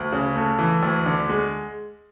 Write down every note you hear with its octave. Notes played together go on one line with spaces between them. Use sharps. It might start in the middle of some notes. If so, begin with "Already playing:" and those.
Already playing: D2
C#3
A3
E3
D2
D3
G#3